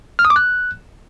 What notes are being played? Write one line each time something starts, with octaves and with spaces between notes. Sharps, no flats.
F6
D#6
D6
F#6